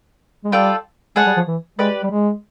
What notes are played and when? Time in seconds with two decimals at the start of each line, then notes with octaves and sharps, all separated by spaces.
0.44 G#3
0.52 G3 F4 A4 D5 G5
1.16 G#3 G#4 C#5 F#5 A5
1.27 G3
1.37 F3
1.48 E3
1.79 G#3 G4 B4 D5
2.03 G3
2.11 G#3